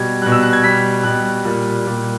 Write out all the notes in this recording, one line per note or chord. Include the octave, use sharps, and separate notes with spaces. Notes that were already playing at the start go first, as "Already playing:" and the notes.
Already playing: B2 G3 G#6
B2 G3 F#6
E6
F#6
G#6
B2 G3 B6
B2 G3 F#6
A#2 G3
A#2 G3